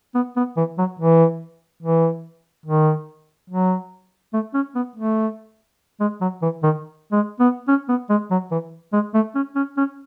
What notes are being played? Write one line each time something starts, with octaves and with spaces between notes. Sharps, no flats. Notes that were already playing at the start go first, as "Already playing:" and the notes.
B3
B3
E3
F#3
E3
E3
D#3
F#3
A3
C#4
B3
A3
G#3
F#3
E3
D#3
G#3
B3
C#4
B3
G#3
F#3
E3
G#3
A3
C#4
C#4
C#4